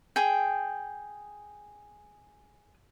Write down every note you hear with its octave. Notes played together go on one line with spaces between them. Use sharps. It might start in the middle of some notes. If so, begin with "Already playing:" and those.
G#4 G5